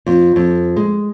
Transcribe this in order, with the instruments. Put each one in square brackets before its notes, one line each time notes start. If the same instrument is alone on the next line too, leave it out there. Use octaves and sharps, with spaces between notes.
[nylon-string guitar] F2
F2
G#3